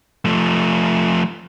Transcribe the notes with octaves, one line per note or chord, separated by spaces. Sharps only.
F3 A3